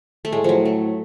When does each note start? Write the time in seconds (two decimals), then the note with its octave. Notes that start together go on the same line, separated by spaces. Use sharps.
0.25 A3
0.32 A2 G#3
0.44 F3 F#3
0.65 A3